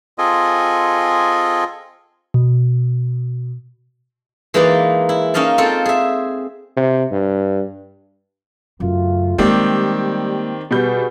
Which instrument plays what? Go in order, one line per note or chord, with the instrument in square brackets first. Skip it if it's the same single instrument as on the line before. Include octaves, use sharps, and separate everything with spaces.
[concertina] C4 F4 G#4 A4 D#5 G#5
[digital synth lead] B2
[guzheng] E3 G#3 A#3 D#4 B4 D5
E4
A#3 C#4 D#4 D#5 F5 A5
C4 F4 A4 C5 G5
G#4 E5
[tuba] C3
G2
[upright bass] F#2 C#3 [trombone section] A3 F4
[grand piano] D#3 C4 D5 [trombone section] G3 [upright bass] G#3 A#3 [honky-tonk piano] G4
[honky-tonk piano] B2 G3 G6 [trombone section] F#4 G#4 B4